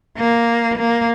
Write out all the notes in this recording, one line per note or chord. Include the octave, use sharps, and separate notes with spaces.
A#3
A#3